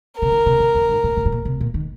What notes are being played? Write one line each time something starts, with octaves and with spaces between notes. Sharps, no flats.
C3 A#4
D#3
C3
C3
F2
G2
A#2
A#2
G2
A#2
C3
A#2
D#3